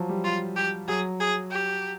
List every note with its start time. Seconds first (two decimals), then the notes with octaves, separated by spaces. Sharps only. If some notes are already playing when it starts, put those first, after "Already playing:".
Already playing: F3 F#3
0.09 G3
0.24 F4
0.56 G4
0.88 F#3 G#4
1.20 G#4
1.51 G4